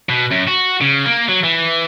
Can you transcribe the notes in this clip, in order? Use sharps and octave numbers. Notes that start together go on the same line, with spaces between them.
B2
F#2
F#4
C#3
A#3
F#3
E3